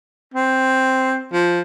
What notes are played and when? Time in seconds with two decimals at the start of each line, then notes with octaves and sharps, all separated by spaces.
0.34 C4
1.33 F3